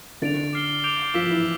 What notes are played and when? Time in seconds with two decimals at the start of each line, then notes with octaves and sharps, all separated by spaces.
0.22 D3 D4 A6 D7 F7
0.53 D6 F6 C7 G7
0.84 D6 G6 D7 F7
1.14 F3 F4 E6 B6 E7
1.30 E3 E4